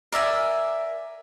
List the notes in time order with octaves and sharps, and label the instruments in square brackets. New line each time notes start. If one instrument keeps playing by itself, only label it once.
[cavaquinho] A#4 D5 E5 G#5